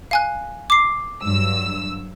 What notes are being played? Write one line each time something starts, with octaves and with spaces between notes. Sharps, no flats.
F5 G#5 F#6
D6 C7
G2 F#3 E6